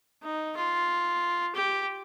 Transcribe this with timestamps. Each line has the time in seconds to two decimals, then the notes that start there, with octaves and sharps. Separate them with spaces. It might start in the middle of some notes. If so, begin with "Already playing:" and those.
0.23 D#4
0.57 F4
1.55 G4